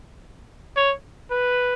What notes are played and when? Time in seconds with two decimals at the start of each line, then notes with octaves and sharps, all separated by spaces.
0.76 C#5
1.31 B4